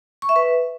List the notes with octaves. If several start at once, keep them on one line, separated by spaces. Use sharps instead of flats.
C#6
E5
B4